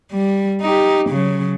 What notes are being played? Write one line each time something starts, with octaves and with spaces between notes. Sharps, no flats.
G3
D#4 G4
C#3 F#3